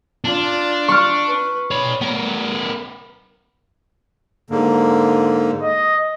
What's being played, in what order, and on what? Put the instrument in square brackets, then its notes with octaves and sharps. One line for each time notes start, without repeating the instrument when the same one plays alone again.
[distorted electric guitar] D4 [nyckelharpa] F4 D5
[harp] C#6 F6
[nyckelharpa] B4
[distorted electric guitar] C#5 B5 [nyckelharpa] D5
[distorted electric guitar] B3 A#4
[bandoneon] G#2 D3 A#3
[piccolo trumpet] D#5